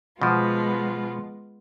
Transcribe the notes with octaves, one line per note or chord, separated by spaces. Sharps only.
B2 F3 G#3 B3 F4